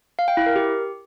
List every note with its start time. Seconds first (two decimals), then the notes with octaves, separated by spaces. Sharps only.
0.19 F5
0.28 G5
0.37 E4
0.46 A#4
0.56 G4